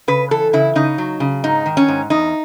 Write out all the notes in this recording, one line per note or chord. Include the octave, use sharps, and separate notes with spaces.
C#3 B4
E3 A4
C#3 E4
C#3 D#4
F#3
C#3
G#2 D#4
D#3
C#4
G#2
E2 D#4